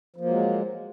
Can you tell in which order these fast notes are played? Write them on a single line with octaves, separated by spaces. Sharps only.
F3 A#3 F#3 G#3